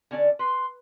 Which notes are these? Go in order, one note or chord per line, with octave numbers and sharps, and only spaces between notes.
D3 C#4 D5
B4 C6